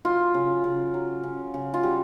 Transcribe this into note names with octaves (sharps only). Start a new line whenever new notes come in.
F#3 F4
C#3
C#3
F#3
C#3
C#3
F4
G3 F#4